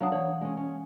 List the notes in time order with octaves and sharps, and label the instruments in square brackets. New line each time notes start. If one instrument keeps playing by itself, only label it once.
[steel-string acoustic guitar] F#3 D4 A5 [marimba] F5 F#5 D#6
[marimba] E3 [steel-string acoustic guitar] C#5
[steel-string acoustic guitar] G#3 C#4
C#4